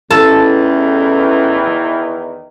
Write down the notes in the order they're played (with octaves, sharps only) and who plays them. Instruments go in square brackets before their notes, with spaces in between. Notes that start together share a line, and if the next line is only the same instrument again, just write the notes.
[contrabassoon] A1 [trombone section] E2 D#3 E3 [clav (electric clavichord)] A4 [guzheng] A5